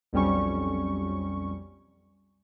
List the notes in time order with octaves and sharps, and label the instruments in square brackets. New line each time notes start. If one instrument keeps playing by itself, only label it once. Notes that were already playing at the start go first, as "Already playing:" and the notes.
[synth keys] B1 F2 G3 C#4 C#6